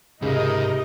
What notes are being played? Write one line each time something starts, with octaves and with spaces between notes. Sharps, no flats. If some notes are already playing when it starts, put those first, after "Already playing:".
C#2 G#2 C3 D#4 A#4 D#5